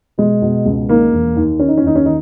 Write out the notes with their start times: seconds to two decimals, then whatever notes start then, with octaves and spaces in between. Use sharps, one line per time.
0.18 B2 G#3
0.42 B2
0.66 C#2
0.88 D#3 A#3
1.12 E1
1.36 D#2
1.59 D#3 C#4
1.68 D#4
1.77 C#4
1.83 D#2 D#4
1.95 C#4
2.06 D#3 D#4